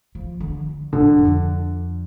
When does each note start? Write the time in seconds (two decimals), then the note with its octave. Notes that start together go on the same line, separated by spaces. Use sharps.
0.15 F3
0.40 D3
0.93 G2 D3
1.18 F2